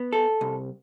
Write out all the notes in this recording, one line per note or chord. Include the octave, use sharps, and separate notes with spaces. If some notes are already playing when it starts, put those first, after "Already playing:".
Already playing: B3
A4
C2